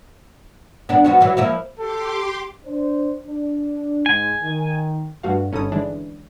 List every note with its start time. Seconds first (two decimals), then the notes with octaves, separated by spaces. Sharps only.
0.89 B3 D4
1.04 F3 B3 F#4
1.21 E3 F#3
1.37 F3 A#3 E4
1.78 G4 A4 C6 D6
2.65 D4 C5
3.24 D4
4.06 G#2 G#3 G#5
4.42 D#3
5.23 G2 A3 F#4 F5
5.52 G1 C#4 D#4 A4 B5 D#6
5.72 E3 G#3 D4